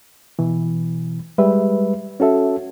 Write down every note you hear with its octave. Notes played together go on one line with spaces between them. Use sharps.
B2 E3
G3 G#3 B4 E5
C#4 F#4 A4 E5